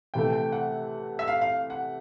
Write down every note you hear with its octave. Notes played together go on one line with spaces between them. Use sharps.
C3 E3 A3 G5
G5
F#5
E5
F5
F5
F#5